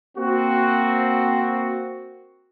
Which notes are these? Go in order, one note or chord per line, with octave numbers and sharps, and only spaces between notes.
A#3 C4 F#4